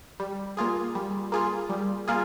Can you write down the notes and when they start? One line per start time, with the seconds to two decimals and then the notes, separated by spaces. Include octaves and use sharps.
0.20 G3
0.57 A#3 F4 G#4
0.95 G3
1.32 A#3 F4 G#4
1.69 G3
2.08 A#3 F4 G#4